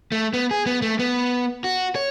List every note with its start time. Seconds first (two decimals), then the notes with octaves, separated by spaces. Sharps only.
0.12 A3
0.34 B3
0.51 G#4
0.66 B3
0.82 A3
0.99 B3
1.64 F#4
1.95 C#5